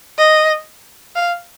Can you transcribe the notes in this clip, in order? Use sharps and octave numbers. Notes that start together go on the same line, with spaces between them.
D#5
F5